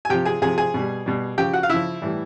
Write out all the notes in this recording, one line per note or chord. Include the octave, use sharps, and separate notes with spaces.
G#5
C3 F3 G4 G5
G#4 G#5
C3 F3 G#4 G#5
G#4 G#5
B2 G3
B2 G3
C#3 F3 G4 G5
F#4 F#5
F5
C#3 F3 E4 E5
A2 E3 G3